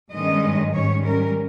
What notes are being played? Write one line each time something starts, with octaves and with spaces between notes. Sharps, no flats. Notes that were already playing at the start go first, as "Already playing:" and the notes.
G2 D#3 G#3 C#4 D#5
G#2 D#3 G3 C#4 C#5
A#4